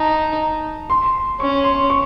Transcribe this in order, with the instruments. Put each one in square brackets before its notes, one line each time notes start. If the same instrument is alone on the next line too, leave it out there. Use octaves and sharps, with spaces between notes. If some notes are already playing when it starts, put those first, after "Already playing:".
Already playing: [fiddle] D#4 [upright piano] A5
[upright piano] C6
[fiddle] C#4 [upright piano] C#6
[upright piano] C6
C#6